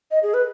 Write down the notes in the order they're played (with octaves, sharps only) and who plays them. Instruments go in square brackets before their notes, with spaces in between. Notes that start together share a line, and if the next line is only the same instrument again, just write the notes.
[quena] D#5
G#4
B4